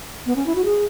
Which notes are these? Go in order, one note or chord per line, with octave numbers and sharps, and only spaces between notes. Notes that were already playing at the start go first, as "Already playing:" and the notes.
B3
C#4
E4
F#4
G#4